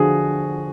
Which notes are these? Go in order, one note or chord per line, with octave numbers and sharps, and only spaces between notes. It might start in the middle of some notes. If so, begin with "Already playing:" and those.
Already playing: D3 F3 F#4 G#4